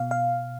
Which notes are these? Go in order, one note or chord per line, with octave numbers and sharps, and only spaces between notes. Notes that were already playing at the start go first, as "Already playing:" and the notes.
Already playing: B2 F5
F5